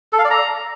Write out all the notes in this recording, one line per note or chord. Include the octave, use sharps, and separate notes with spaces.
A4
F5
D5
A#5